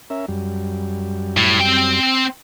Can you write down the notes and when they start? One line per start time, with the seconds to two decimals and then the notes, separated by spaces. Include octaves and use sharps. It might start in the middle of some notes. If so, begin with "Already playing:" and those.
0.10 C#4 A#4 E5
0.28 F#2 G3
1.37 A2
1.61 C4 G5